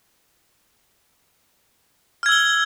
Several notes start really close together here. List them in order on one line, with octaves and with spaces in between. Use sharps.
F6 G#6 E6 G7